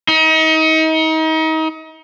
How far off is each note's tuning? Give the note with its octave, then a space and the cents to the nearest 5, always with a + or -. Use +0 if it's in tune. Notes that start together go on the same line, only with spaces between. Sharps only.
D#4 +35